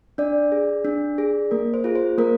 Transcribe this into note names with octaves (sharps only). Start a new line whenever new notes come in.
D4 D5
G#4
D4
G#4
A#3 A#4
C5
F4 G#4
C5
A#3 A#4